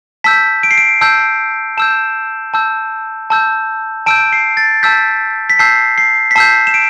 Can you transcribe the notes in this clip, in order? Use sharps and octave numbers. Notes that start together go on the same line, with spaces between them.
A5 E6 G6 B6
D7
C7
D7
A5 E6 G6
A5 E6 G6 E7
A5 E6 G6
A5 E6 G6
A5 E6 G6 D7
C7
A6
A5 E6 G6 B6
B6
A5 E6 G6 C7
C7
B6
A5 E6 G6 C7
E7
D7